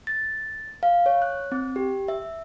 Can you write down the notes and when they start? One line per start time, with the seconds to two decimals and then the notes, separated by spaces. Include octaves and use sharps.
0.07 A6
0.83 F5
1.06 C#5
1.22 F#6
1.52 C4
1.76 G4
2.08 E5